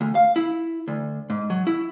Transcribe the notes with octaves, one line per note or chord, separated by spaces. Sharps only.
D2
F5
E4
D2
G#2
F#3
E4